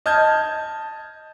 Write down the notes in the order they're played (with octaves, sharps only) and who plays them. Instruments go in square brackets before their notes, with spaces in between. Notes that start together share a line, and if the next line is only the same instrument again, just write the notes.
[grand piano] D#5 A5 F6 G6 G#6